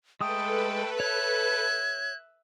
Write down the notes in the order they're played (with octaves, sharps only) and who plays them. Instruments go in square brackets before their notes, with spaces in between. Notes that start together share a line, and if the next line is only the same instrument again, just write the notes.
[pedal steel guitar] G#3 D#6 [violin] A3 [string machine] A4 B4 [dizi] G5
[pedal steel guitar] C#5 [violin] E5 F#6 [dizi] G#6